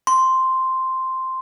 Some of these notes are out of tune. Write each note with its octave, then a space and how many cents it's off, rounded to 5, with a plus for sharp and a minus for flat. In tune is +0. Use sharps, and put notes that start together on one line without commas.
C6 +0